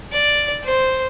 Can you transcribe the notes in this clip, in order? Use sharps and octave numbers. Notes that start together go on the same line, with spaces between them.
D5
C5